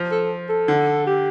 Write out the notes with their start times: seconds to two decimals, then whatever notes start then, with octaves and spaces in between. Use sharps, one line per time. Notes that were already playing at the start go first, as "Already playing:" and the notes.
Already playing: F3
0.11 A4
0.49 A4
0.68 D3
1.06 G4